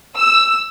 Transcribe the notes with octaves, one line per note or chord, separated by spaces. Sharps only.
E6